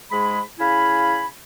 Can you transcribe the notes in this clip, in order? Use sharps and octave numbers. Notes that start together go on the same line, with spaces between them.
G#2 G#3 G#4 B5
C#3 E4 F5 G#5 B5